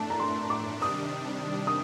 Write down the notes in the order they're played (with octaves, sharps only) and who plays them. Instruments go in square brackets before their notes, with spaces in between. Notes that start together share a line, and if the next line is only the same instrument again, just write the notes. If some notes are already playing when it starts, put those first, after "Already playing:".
Already playing: [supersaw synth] A2 A3 D4 [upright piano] A5
[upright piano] A#5
C6
D6
[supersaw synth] C3 D#3 G3 D4 [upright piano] D#6
[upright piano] D#6